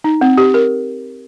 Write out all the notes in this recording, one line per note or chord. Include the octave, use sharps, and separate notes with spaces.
D#4
C4
G4
A#4